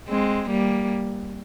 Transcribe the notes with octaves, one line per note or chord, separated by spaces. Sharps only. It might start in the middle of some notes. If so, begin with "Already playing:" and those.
G#3 C4
G3 A#3